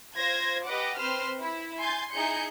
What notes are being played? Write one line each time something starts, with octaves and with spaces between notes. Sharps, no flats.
F4 C5 G#6 A#6
G4 B4 D#5 F#5 D6
C4 B4 C5 C6 F6
E4
G#5 C6 G6 A6
D#4 E4 G#4 G6 C#7